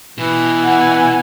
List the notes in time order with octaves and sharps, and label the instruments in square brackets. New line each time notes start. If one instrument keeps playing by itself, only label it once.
[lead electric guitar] B2 [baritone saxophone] E3
[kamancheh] F#5 G#5